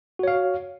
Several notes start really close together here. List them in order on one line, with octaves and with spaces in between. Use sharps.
F#4 C#5 F5